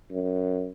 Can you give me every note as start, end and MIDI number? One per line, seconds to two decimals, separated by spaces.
0.11 0.70 42